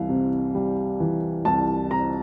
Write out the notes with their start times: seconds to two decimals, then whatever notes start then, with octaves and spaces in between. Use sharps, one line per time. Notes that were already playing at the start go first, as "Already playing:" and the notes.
Already playing: C2 E3 F5
0.09 C3
0.55 G3
1.00 E3
1.45 C2 A5
1.91 C3 A#5